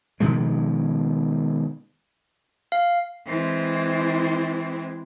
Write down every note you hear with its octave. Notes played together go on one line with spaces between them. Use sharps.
B2 D#3 F3 G#3
F5
E3 G#3 C4